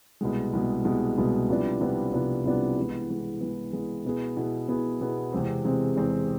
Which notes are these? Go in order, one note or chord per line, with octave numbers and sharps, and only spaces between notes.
C2 B2 G#3
C2 B2 G#3
C2 B2 G#3
C2 B2 G#3
C2 C3 F3 B3 D4
C2 C3 F3 B3 D4
C2 C3 F3 B3 D4
C2 C3 F3 B3 D4
E3 G#3 B3
E3 G#3 B3
E3 G#3 B3
E3 G#3 B3
B2 B3 E4 G#4
B2 B3 E4 G#4
B2 B3 E4 G#4
B2 B3 E4 G#4
E2 C3 G#3 C4
E2 C3 G#3 C4
E2 C3 G#3 C4